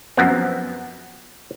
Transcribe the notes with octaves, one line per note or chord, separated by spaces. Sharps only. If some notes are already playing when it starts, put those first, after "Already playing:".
F#2 F3 B3 C4